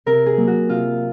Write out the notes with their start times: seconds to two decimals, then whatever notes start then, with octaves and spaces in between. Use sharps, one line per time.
0.06 C3 A#4
0.26 G#4
0.37 F#3 A#3
0.47 F#4
0.69 C3 F4